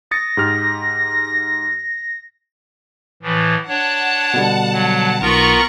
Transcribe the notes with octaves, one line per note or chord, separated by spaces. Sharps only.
D#6 A6 A#6 C#7
G#2 G4 F6
A2 E3 F3
D4 C#5 F#5 A5
B2 D3 G3
F#3
B1 B3 F4 A#4 A#5 C#6